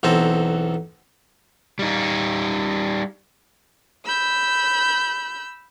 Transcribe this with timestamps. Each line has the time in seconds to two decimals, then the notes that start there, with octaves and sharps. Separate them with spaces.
0.03 B1 E2 C4 A4 C5 A#5
1.79 G3 D#4
4.05 B5 E6 G6